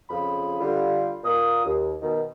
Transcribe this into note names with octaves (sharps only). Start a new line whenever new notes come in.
F2 C#3 F4 G#4 B5
D3 G3 F4
A#2 A#3 D#6
D#2
B2 D#3